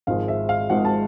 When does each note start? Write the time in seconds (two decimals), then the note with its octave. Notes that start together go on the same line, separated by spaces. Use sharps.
0.07 G#1 G#2 F3 G#3 F5
0.28 E5
0.49 F5
0.70 G#1 G#2 F3 G#3 F#5
0.85 A5